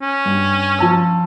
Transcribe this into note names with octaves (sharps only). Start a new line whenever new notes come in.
C#4
G2
F3 A5 E6